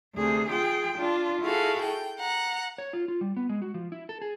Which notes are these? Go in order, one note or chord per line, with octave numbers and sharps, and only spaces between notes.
D2 C3 G#4
F4 G#4 G5
D4 F4
E4 F#4 G#4 A4 F5
G5
F#5 A#5
C#5
F4
F4
G3
B3
G#3
F#4
F3
E4
A4
G#4